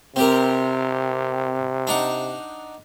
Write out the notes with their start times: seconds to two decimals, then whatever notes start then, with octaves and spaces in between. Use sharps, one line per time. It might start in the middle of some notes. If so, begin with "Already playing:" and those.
0.16 C3 C4 G4 A#4
1.87 D4 D#4 F#5